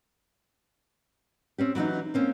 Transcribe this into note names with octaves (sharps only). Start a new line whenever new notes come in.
C4 C#4 G4
E3 F#3 B3 C#4 D#4
A#3 C4 C#4